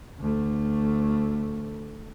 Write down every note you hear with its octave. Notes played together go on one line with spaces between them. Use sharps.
D2 A3